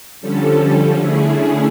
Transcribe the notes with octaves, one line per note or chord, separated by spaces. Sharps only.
D3 F3 G3 C#4 A4
D3 A3 C#4 E4 G#4